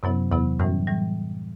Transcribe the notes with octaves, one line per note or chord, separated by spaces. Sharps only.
F#2 C3 F#3 B3 E4
E2 C3 F#3 B3 E4
F#2 A2 E3 G3
A2 E3 G3